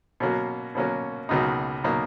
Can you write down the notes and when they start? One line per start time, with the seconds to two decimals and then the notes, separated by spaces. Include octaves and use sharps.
0.20 B2 F#3 A#3 C#4
0.75 B2 F#3 A#3 C#4
1.29 C#2 B2 F#3 A#3 D#4
1.84 B2 F#3 A#3 D#4